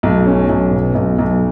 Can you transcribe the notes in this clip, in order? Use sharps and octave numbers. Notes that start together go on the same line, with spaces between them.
B1
C#4
B1
B2
B1
B1